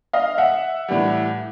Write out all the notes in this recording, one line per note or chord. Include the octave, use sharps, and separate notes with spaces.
D#5 F5
E5 F#5
A2 E3 G3